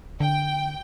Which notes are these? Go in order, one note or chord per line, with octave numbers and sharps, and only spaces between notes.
D3 G5